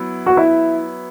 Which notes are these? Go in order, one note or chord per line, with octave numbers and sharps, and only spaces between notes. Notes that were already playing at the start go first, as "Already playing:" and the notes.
Already playing: F#3 B3 E4
F#4
E4